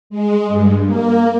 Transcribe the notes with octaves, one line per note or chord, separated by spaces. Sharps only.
G#3
G2
A#3